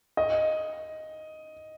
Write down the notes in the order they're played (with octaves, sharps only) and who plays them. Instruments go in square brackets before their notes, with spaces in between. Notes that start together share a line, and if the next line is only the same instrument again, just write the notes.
[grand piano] D#5